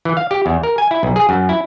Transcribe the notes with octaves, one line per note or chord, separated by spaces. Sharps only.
E3
F5
G4
E2
A#4
G#5
E4
B1
G#4
F#2
E4